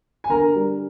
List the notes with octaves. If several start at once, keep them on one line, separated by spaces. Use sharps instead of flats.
G#5
D3 A#4 A#5
G3